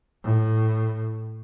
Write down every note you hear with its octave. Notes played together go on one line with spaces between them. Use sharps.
A2